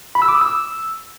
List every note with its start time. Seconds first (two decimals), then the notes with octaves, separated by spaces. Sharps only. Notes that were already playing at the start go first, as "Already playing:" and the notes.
0.15 B5
0.22 E6
0.28 D6
0.35 D#6
0.41 E6